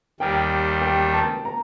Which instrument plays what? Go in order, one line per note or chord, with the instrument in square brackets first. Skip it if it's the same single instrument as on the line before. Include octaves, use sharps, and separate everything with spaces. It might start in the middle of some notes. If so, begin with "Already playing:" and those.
[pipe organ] D#2 D#3 G3 [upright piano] G5
[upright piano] G5
A5
A#5